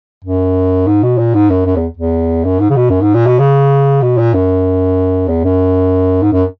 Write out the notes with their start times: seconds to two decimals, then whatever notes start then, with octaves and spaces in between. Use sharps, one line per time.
0.24 F#2
0.87 G#2
1.03 B2
1.18 A#2
1.34 G#2
1.50 F#2
1.66 F#2
1.76 E2
1.97 E2
2.45 F#2
2.60 G#2
2.70 C#3
2.76 B2
2.90 F#2
3.02 G#2
3.14 A#2
3.27 B2
3.39 C#3
4.02 B2
4.18 A#2
4.34 F#2
5.28 E2
5.44 F#2
6.22 G#2
6.33 F#2